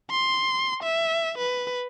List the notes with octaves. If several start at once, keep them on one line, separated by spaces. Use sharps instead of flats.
C6
E5
B4